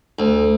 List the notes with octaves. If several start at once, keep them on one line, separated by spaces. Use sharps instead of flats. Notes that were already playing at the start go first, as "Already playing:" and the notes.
D2